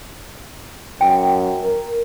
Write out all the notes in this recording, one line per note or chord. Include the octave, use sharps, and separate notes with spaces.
F#2 G5
A#4